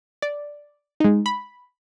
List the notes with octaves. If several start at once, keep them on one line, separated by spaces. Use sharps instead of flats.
D5
G#3 D#4
B5